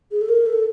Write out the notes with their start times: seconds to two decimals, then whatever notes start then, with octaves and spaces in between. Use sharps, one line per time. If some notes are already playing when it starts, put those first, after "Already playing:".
0.11 G#4
0.21 A4
0.29 A#4
0.46 A4